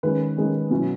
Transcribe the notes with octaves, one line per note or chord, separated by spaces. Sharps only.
D#3 G#3 C#4 B4
D#3 G#3 C#4
B2 F#3 C#4 E4